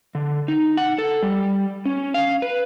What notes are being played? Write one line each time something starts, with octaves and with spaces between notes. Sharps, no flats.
D3
D#4
F#5
A4
G3
C#4
F5
B4